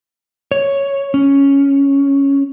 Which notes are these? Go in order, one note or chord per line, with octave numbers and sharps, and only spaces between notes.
C#5
C#4